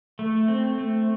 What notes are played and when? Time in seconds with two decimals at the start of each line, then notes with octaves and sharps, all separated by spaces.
0.19 A3
0.48 C4
0.78 A3